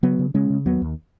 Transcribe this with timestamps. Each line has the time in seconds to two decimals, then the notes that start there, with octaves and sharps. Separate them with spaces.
0.03 C#3 F#3 B3
0.19 C#3
0.34 C#3 G#3 C#4
0.50 C#3
0.66 D#2 F#3 B3
0.82 D#2